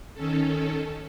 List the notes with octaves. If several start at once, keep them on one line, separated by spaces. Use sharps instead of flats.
D#3 C#4 A4